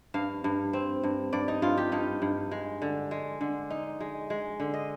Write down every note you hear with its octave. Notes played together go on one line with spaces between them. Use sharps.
G2 F5
G2
C4
G2
G2 D5
D#4
G2 F4
G4
G2 D#4
G2
G#3
D3
G#3
D3
D#4
G#3
G#3
D3
D#5